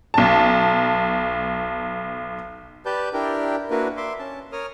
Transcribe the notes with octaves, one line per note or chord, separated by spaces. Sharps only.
B1 A5
G4 B4 D5 A5 G6
D4 E4 G4 A#4 G5
A#3 D4 E4 F#4 A#4 B4
E5 C6 D6
C#4 A5
A#4 C#5 D#6 F6